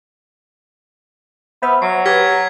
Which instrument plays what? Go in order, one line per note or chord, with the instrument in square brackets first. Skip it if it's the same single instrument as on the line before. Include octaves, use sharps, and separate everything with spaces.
[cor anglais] B3 [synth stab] C5 E5 F6
[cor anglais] F#3 [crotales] C7
[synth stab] G4 B4 [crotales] F6 G#6 B6